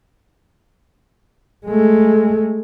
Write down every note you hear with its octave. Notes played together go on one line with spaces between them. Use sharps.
G#3 A3